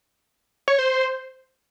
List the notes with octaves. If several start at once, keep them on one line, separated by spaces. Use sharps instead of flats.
C#5
C5